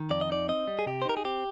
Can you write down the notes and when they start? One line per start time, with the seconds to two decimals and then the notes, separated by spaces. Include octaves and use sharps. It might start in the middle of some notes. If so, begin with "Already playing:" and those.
Already playing: D#3
0.10 F2 D5
0.21 D#5
0.30 D#4 D5
0.49 C4 D#5
0.67 G3
0.79 G#4
0.86 C3 G4
1.02 C5
1.05 D#4 A#4
1.17 G#4
1.25 C4 G4